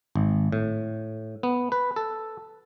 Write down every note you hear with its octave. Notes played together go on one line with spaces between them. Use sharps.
G#1
A2
B3
B4
A4